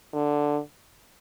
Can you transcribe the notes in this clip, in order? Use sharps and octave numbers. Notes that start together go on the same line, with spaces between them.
D3